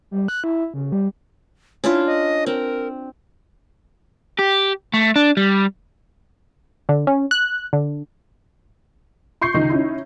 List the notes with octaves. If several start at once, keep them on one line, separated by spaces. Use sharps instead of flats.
G3
F#6
E4
C#3
G3
C#4 D4 E4 F4
D#5
C4 A#4
G4
A3
D4
G3
D3
C#4
F#6
D3
C6 C#6 G6 C7
C#2 D#3 D#4
C#4 D#4 E4